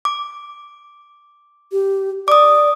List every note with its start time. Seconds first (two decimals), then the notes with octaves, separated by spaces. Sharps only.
0.05 D6
1.72 G4
2.28 D5 D6 D#6